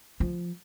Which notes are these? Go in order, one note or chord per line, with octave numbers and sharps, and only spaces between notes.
F3